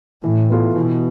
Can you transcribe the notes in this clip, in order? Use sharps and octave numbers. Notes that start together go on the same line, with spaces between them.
A2 E3
B3 F4 A4
B2 E3